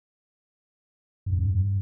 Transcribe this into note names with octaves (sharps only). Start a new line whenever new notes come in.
G2
F2
G2